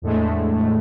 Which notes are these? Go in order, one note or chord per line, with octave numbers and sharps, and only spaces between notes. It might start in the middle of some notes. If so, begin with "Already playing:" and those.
E2 A2 D3 G#3 A3